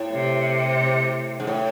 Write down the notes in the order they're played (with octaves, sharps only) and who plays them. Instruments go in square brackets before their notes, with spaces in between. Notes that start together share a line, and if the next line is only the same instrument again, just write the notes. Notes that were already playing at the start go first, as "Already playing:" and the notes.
Already playing: [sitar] A2
[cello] C3
[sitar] G#2
A2